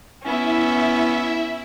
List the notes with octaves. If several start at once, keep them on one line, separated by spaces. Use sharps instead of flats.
B3 C#4 E4 E5